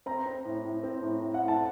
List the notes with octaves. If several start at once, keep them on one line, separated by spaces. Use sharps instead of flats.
C4 A#5
C4
A2
A2
C4
A2
A2
F#5
A2
A5